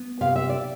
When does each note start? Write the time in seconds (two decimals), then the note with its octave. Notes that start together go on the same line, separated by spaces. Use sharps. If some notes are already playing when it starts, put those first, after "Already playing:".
Already playing: B3
0.21 C3 F5
0.36 E5
0.49 D5